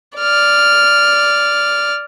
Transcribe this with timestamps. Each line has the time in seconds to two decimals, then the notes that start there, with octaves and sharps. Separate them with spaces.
0.18 D5 F6